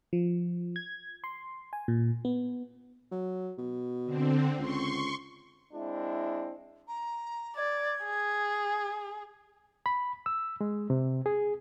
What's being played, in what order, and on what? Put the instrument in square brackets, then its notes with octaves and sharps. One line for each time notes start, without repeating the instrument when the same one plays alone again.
[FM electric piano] F3
G#6
C6
G#5
A#2
B3
[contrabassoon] F#3
B2
[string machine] D3 C4
[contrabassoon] C#2 [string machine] C6 C#6
[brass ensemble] G#3 C4 D4 E4
[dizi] A#5
[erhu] D5 [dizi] G#6
[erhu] G#4
[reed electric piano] B5
E6
G#3
C3
G#4